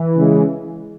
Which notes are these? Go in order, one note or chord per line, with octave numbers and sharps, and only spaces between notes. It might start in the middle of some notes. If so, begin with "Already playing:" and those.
Already playing: E3
C#3 G#3